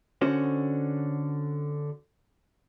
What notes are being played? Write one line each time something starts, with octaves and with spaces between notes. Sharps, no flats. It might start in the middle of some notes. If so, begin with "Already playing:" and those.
D3 C#4 F#4 C5